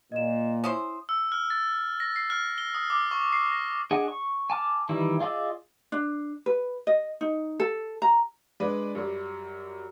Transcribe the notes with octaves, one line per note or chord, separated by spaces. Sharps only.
A#2 D#5 E7
C#4 E4 C5 D#6
E6
F6
A6
A#6
C7
F6
G7
D#6
D6
C#6
C7
A#6
D4 G#4 D#5 F#5 G#5
C#6
G#5 A5 D6 F6
D#3 E3 G3 E4
F4 G#4 D5 D#5 E6
D4
B4
D#5
D#4
A4
A#5
G#3 D4 B4 D5
F#2 F#3 G3